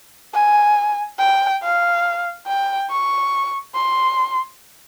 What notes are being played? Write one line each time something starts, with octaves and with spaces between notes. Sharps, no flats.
G#5
G5
F5
G5
C#6
C6